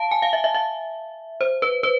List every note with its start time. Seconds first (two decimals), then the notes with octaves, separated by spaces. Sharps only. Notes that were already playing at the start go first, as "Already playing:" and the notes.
Already playing: F5 A5
0.11 G#5
0.22 F5
0.33 E5
0.44 E5
0.54 E5
1.41 C5
1.62 B4
1.83 B4